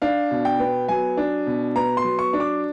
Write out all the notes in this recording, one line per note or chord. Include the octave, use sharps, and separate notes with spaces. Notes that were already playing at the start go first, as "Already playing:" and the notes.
D4 F5
B2
G5
B3
F#3 G#5
D4
B2
B3 A#5
C6
F#3
C#6
D4
D6